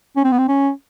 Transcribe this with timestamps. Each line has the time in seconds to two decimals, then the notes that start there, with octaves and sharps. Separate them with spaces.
0.16 C#4
0.24 C4
0.32 B3
0.38 C4
0.48 C#4